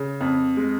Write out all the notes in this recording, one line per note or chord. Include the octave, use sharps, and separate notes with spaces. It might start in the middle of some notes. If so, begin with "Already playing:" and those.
Already playing: C#3
F2
G#3